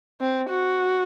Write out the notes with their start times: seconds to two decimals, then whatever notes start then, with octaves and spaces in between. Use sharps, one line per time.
0.21 C4
0.49 F#4